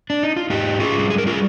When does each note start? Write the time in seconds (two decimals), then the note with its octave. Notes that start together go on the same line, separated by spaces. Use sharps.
0.10 D4
0.23 D#4
0.36 F4
0.50 G#2 D#4 G4
0.80 F4 G#4
0.95 G3
1.10 G#4
1.18 A#4
1.27 F4 G#4